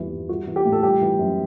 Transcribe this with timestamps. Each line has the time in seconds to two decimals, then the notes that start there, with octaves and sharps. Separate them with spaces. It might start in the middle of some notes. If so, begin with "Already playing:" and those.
Already playing: E2 E3 G3
0.11 G2
0.29 G3 F#4
0.47 E3
0.56 G4
0.65 A2
0.72 A4
0.83 G3 G4
1.01 E3
1.19 F#2